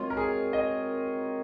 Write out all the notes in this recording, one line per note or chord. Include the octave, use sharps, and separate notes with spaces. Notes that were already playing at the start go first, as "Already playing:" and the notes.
Already playing: D#3 G#3 C4 F4 F#4 C#5
A#4
G#4
D#5